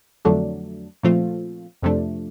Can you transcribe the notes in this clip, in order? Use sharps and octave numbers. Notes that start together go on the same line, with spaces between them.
F2 D3 F#3 A3 D4
A#2 F3 A3 C4 F4
F2 C3 F3 A3 D4